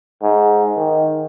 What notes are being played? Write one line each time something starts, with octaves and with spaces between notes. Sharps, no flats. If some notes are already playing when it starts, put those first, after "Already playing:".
G#2
D#3